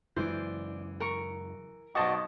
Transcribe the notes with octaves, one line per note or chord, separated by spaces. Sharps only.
F#2 C#3 E3 G#3 C5 D5
A#4 C#6
B1 F#4 C5 D5 D#5 A5 C#6